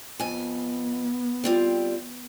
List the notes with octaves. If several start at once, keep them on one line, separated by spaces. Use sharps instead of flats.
F2 B3 G#5
G3 C4 F4